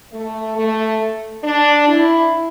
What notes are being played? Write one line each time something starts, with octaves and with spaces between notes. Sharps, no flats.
A3
A3
D4
E4